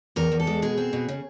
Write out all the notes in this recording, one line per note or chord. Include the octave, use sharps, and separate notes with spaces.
E2 A#4
E2
A4
G#3
B2 G#4
C4
B2
C#3